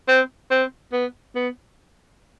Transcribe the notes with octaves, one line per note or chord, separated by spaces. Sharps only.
C4
C4
B3
B3